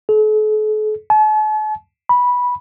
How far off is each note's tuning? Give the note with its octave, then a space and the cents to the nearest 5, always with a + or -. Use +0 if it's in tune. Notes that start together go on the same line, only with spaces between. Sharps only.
A4 -45
A5 -45
B5 -10